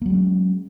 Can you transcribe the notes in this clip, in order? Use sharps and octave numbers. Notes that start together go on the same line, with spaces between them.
F#3 G#3 A#3 C#4